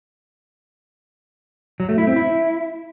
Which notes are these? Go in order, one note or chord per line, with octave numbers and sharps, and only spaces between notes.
F#3
A3
E4
C4
E4